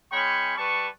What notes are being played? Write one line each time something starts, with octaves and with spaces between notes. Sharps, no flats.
G#3 C#4 C#5 G5 B5 C#6
G3 B4 A5 C#6